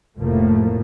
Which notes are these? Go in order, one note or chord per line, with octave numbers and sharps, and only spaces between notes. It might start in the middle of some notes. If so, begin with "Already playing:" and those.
F1 A2 F3 A3 A#3